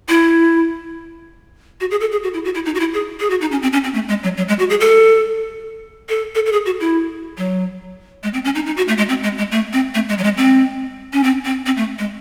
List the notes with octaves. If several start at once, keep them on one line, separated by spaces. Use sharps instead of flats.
E4
F#4
G#4
A4
G#4
F#4
E4
F#4
E4
D#4
F#4
E4
G#4
G#4
F#4
D#4
C#4
C4
C#4
C4
A3
G#3
F#3
F#3
G#3
F#4
G#4
A4
A4
A4
A4
G#4
F#4
E4
F#3
G#3
C4
C#4
D#4
D#4
F#4
A3
G#3
C4
G#3
G#3
A3
C4
A3
G#3
F#3
G#3
C4
C#4
C4
C4
C4
A3
G#3